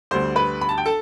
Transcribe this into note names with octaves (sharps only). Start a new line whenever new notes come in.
D2 D3 G3 C5 C6
B4 B5
B5
A5
G5
A4 A5